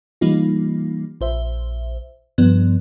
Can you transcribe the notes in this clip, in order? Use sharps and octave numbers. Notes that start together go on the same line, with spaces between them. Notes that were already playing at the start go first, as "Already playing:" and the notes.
E3 G3 A#3 D#4 F4
A#1 C5 E5
G2 F3 B3